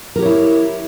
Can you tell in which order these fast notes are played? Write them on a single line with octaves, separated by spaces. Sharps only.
A#4 G4 C#5 E4